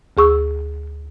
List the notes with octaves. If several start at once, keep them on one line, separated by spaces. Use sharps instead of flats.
D2 G#4 C#6 E6